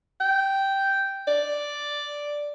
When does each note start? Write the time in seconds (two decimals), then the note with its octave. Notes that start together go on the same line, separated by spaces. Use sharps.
0.20 G5
1.27 D5